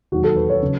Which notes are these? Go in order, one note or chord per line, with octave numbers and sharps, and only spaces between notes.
E1 D#2 D#3 F#3 F#4
A4
B4
C#5
C#3 F#3